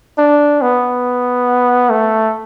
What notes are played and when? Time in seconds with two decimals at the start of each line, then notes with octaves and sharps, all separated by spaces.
0.18 D4
0.62 B3
1.90 A3